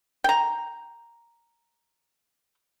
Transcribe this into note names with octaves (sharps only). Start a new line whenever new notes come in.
G5 A#5